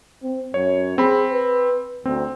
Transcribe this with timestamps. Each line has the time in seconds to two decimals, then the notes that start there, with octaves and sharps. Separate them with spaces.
0.23 C4
0.54 F#2 C#5
0.98 C4 G#4 B5
1.32 B4
2.05 D2 C4